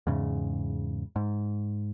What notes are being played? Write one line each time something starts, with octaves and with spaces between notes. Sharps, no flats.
E2 G#2 C#3
G#2